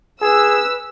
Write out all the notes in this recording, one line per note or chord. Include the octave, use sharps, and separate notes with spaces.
G#4 B4 E6